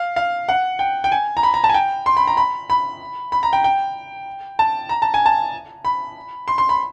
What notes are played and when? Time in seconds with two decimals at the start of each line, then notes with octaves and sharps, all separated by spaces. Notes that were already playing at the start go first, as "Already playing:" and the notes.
Already playing: F5
0.16 F5
0.49 F#5
0.79 G5
1.04 G5
1.12 G#5
1.37 A#5
1.43 B5
1.54 A#5
1.64 A5
1.69 G#5
1.74 G5
2.06 C6
2.17 B5
2.27 A#5
2.37 B5
2.70 B5
3.32 B5
3.43 A#5
3.53 G5
3.64 G5
4.59 A5
4.89 A#5
5.02 A5
5.14 G#5
5.26 A5
5.85 B5
6.48 C6
6.58 C6
6.69 B5